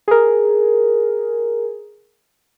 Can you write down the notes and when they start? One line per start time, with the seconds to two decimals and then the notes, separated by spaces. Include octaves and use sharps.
0.08 G#4 A#4